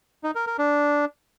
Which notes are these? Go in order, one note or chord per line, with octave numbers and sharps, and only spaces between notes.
D#4
A#4
A#4
D4